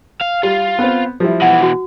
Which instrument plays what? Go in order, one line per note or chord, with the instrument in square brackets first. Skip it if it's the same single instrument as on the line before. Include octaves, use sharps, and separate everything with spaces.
[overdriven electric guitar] F5
[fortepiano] G3 [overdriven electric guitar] F4
[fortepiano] B3 C4
F3 G3 E4
[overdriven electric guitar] B2 E3 [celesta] F#5
[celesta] F#4